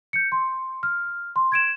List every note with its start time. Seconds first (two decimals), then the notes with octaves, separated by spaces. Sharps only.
0.13 G6 C#7
0.32 C6
0.83 F6
1.36 C6
1.52 G#6 D7 E7